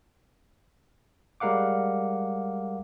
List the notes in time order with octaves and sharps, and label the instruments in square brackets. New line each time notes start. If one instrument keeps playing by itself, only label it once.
[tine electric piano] G3 G#3 A#4 F5 F#5 D6